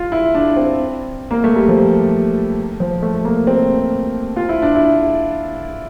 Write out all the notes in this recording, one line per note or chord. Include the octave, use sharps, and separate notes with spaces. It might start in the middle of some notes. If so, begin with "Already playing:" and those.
Already playing: F4
E4
D4
C4
A#3
A3
G3
F3
F3
A3
A#3
C4
F4
E4
D4
E4